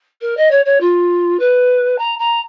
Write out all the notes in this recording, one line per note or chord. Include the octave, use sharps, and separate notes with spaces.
A#4
D#5
C#5
C#5
F4
B4
A#5
A#5